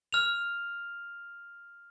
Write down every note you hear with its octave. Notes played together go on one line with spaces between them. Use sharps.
F6 F7